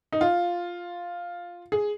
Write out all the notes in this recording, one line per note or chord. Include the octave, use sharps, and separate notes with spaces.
D#4
F4
G#4